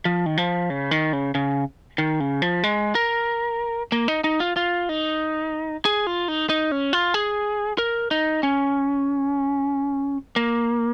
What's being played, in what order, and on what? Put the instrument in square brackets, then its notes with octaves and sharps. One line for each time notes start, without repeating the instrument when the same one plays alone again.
[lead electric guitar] F3
D#3
F3
C#3
D#3
C#3
C#3
D#3
C#3
F3
G#3
A#4
A#3
D#4
D#4
F4
F4
D#4
G#4
F4
D#4
D#4
C#4
F4
G#4
A#4
D#4
C#4
A#3